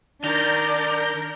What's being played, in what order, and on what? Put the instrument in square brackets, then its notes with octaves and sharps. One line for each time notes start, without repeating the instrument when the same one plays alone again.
[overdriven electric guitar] D#3 [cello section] D4 A#4 [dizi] D5 [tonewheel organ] A#5 G6